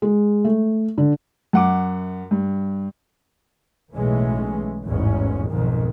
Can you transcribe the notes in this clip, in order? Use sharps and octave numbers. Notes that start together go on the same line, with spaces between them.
G#3
A3
D3
F#2 F#5 D6
G2
B1 A2 E3 G#3 A3 C#4
A1 E2 G#2 C#4
B1 F2 G#2 D#3